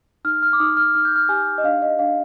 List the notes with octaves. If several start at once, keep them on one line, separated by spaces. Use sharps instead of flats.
D#4 F6
F6
D6
D#4 D#6
F6
D#4 F6
G6
F6
G4 G#5
D#5
D4 F5
D#5
D4 F5